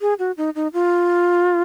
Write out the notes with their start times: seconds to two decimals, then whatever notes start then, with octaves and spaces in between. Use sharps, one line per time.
0.01 G#4
0.19 F#4
0.37 D#4
0.55 D#4
0.73 F4